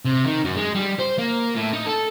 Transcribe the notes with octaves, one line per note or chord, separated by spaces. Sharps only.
C3
D#3
F#2
G#3
G3
C5
A#3
A2
D#4
A4